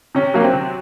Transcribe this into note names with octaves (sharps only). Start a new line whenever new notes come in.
C3 C#4
F#3 A#3
C4
C3